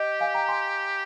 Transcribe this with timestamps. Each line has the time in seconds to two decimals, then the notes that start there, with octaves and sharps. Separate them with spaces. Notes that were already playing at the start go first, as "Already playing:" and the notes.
Already playing: G4 D#5 G5
0.20 F5 G#5
0.34 G5 A#5
0.48 G#5 C6